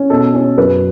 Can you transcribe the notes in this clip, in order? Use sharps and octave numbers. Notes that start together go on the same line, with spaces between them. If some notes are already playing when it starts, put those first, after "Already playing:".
Already playing: C#4
B2 A4
C#4
F#2 B4